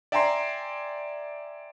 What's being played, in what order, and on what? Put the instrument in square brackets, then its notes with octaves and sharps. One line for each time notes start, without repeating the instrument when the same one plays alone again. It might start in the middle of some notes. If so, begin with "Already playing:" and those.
[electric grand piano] D5 E5 G5 G#5 A#5 C6